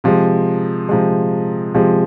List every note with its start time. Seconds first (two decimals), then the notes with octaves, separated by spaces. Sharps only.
0.04 C3 F3 G#3
0.89 C3 F3 G#3
1.75 C3 F3 G#3